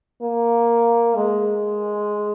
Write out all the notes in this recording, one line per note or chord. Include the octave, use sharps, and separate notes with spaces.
A#3
G#3